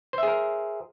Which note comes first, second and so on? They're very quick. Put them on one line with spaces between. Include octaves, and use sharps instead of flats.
C5 E5 G#4 A#4